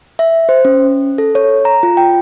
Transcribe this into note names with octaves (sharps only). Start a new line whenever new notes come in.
E5
C5
C#4
A4
C#5
A#5
F4
G5